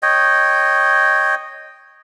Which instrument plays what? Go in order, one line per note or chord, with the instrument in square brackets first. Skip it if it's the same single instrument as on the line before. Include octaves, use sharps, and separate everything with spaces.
[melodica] C#5 D#5 G5